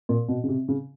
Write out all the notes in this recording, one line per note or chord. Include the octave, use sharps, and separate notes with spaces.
A#2
B2
C#3
C3
C#3